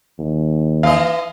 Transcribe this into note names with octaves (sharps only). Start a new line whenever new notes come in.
D#2
E3 D#5 F5